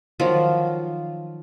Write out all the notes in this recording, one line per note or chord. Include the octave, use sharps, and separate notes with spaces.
D#3 F3 F#3 F4